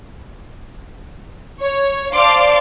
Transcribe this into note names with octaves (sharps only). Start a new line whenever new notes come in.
C#5
C5 D5 F5 A5 C6 D6